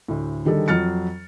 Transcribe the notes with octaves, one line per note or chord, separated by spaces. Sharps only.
D2 A2
D3 D#3 G3 G#4 A4
F2 F#3 F6 A6 C#7